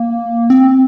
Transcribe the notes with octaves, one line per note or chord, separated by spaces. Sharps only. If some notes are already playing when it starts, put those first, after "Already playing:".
Already playing: A#3
C4